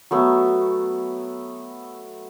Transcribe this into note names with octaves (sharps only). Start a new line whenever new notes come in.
F#3 A3 B3